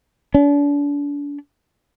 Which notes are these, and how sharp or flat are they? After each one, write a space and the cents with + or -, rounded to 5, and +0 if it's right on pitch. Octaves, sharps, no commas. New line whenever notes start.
D4 -35